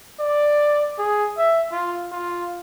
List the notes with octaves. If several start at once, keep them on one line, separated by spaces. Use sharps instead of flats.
D5
G#4
E5
F4
F4